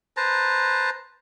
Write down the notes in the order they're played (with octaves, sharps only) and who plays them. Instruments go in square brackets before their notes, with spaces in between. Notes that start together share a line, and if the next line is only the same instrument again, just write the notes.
[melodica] B4 C5 A5 A#5